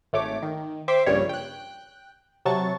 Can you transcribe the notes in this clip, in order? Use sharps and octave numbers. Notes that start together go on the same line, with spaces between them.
G#1 A3 C#5 D6
D#3
C5 E5 G5 D6 C7
A#1 G2 A#2 C#3 G3 C#5
G5 F#6
C3 F#3 A5 C#6 A6